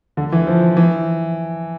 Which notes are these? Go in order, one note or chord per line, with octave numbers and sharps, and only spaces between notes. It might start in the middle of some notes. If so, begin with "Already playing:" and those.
D3
E3
F3
E3